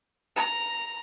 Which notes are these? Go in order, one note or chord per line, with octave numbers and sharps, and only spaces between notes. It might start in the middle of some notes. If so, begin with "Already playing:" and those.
A#5